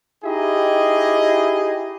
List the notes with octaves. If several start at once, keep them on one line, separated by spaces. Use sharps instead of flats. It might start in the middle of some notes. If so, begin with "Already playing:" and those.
D#4 E4 G4 G#4 D#5